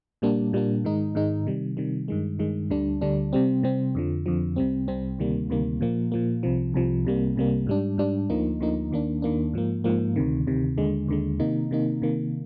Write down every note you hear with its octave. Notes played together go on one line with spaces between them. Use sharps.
A#2 G3 A#3 D4
A#2 G3 A#3 D4
G#2 D#3 G#3 D#4
G#2 D#3 G#3 D#4
C3 D#3 G3
C3 D#3 G3
G2 D#3 G#3
G2 D#3 G#3
D2 D3 G3 D4
D2 D3 G3 D4
C3 G3 C4
C3 G3 C4
F2 D3 F3
F2 D3 F3
C2 C3 G3 C4
C2 C3 G3 C4
D2 C3 D#3 G3 A#3
D2 C3 D#3 G3 A#3
A#2 F3 A#3
A#2 F3 A#3
C2 C3 F3
C2 C3 F3
C2 C3 G3 A#3
C2 C3 G3 A#3
G#2 G3 D4
G#2 G3 D4
D2 D3 F3 A#3 D#4
D2 D3 F3 A#3 D#4
D#2 D#3 A#3 D4
D#2 D#3 A#3 D4
G#2 F3 A#3
G#2 F3 A#3
D2 C3 D#3
D2 C3 D#3
D#2 D3 G#3
D#2 D3 G#3
C3 D#3 A#3 D#4
C3 D#3 A#3 D#4
C3 D#3 A#3